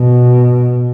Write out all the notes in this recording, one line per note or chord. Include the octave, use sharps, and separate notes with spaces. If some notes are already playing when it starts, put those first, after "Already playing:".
Already playing: B2